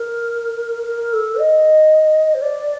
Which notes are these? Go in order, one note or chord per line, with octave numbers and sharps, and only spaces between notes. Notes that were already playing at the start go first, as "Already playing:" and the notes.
Already playing: A#4
A#4
A4
D#5
C5
D5